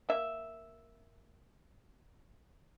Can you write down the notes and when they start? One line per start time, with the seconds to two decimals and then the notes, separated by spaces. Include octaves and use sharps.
0.09 A#3 E5